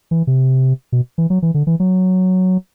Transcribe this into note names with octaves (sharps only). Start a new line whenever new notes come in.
E3
C3
B2
E3
F#3
E3
D3
E3
F#3